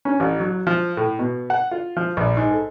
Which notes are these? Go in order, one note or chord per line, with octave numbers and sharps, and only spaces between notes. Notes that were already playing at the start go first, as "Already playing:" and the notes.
C#4
A1
F#3
F3
A2
B2
F#5
F4
F3
A#1
G#2
A4